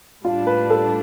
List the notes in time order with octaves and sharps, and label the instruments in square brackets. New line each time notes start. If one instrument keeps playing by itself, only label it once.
[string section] A2 G3 D4 [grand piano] F4
[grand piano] B4
A4